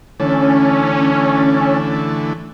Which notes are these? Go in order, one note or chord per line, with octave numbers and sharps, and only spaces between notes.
D3 E3 A3 C#4